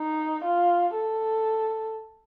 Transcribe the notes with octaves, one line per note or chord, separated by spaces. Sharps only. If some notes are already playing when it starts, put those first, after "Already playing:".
Already playing: D#4
F4
A4